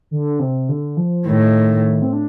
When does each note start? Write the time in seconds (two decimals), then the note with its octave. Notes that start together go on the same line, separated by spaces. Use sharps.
0.11 D3
0.39 C3
0.69 D3
0.97 F3
1.26 A2 D#3
2.02 C4
2.13 D4